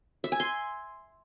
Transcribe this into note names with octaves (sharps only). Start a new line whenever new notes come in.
E5
G#5
C6